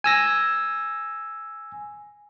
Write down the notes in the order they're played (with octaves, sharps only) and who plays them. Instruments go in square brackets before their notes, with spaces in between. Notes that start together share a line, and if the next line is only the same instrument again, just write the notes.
[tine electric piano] G#5 E6 A#6